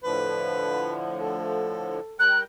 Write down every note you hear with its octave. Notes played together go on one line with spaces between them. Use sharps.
A2 D3 F3 B4
A4
G3 A#4 G5 F#6